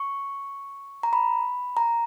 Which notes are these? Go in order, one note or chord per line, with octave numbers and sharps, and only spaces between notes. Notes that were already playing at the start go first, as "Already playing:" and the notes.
Already playing: C#6
A#5
B5
A#5